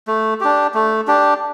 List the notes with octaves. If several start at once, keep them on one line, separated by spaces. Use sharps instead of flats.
A3
D4 G4
A3
D4 G4